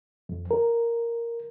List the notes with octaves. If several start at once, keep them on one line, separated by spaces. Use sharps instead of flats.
F2
A#4